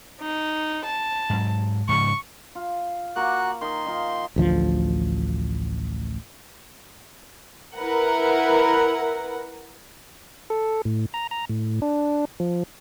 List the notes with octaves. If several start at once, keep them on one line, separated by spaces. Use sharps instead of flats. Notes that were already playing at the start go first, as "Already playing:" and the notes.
D#4
A5
G#2 F#3
G#2 C#3 F3 C#6
F4
A#3 F#4 A#5 C#6 F#6
D#3 D#5 C6
D#3 D#4 F4
A1 D2 F3
E4 A#4 B4 F#5
A4
A2
A#5
A#5
A2
D4
F3